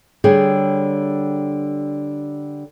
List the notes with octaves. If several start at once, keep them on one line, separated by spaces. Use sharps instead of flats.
D3 G3 G#4 C#5 G5